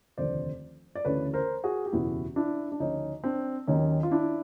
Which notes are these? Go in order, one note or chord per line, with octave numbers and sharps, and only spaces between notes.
F1 D#2 D3 F3 C5 D5
D5
D2 C#3 E3 B4 C#5
A#4 C5
F#4 G#4
G4
F#1 E2 B2 E4 F#4
D4 E4
D4
D2 C#3 F3 C#4 D#4
C4 D4
D#2 D#3 F#3 C#4 D#4
F4
D4 E4